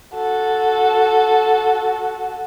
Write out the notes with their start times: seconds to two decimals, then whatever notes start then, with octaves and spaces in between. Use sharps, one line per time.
0.14 F#4 A4